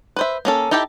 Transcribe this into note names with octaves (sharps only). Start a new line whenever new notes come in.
B4 C5 E5
A#3 C#4 A4
D#4 E4 G4 A4 G5